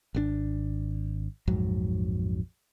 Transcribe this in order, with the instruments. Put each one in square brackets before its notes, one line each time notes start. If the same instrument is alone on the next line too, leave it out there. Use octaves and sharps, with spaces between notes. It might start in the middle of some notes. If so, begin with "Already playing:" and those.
[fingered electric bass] G#1 C3 D4
A#1 F2 G#2 F#3